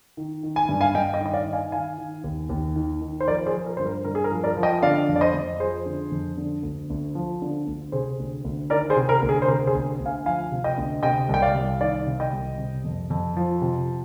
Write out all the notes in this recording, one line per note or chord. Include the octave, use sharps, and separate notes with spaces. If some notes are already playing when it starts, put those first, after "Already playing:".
D#3
D#3
G#5
G2
F5 G#5
G2 D#5 G5
D#5 G5
D#3
D#5
D5 F5
D#3
F5 G#5
D#3 F5 G#5
D#3
D#2
D#2
D#3
D#3
C5
F3 A#4 D5
G#4 C5
F3
A#4
G2 C5
A#4
G2 A#4
G#4
A#4
F3
A#4 D5
F3
D#5 G5
D3 D5 F5
F2
D5
C5 D#5
F2
F3 G#4 C5
D3
F2
D3
D2
D2
F3
D3
D2
C3 G#4 C5
D2
D2
D#3 A#4 D5
G#4 C5
C3
A#4
D2
G#4
C5
C3 A#4
G#4 C5
D2
D2
F5 G#5
F3 F5 G#5
C3
D#5 G5
D2
C3 D#5 G5
C2
G5
D5 F5
C2
D#3 D5 F5
C3
D#5 G5
C2
C3
F2
F2
F3
C3